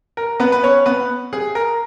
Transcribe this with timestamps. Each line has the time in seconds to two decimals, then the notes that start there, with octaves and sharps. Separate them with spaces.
0.17 A#4
0.40 B3 B4
0.52 B4
0.63 C#4 C#5
0.86 B3 B4
1.33 G#4
1.55 A#4